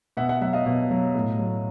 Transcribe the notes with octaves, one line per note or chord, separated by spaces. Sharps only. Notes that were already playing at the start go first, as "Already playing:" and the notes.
B2 E5 F#5
E5 F#5
F#3 E5 F#5
D#5 F5
B2
F#3
A2
F#3